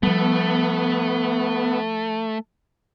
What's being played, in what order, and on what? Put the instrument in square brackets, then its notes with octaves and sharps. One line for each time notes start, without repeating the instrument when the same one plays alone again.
[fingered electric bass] F3 G3 [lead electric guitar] A3 [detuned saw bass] B3